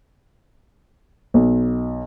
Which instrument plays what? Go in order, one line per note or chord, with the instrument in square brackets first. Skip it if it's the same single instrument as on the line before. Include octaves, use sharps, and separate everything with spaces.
[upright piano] B1